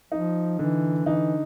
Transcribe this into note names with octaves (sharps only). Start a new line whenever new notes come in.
F3 D#4
D3 E3
E3 D#4